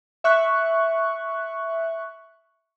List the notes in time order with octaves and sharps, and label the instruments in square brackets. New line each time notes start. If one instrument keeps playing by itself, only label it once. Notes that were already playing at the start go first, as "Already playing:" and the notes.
[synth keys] E5 C#6 F#6